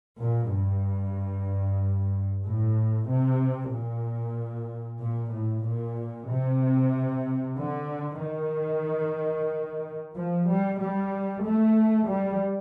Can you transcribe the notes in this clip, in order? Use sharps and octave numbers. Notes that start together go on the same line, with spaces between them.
A#2
G2
A2
C3
A#2
A#2
A2
A#2
C3
D3
D#3
F3
G3
G3
A3
G3